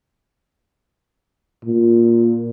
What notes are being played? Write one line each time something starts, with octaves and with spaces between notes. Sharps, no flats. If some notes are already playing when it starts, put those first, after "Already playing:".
A#2